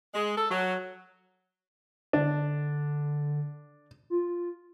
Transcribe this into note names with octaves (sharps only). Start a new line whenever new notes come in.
G#3
A4
F#3
D3 D4
F4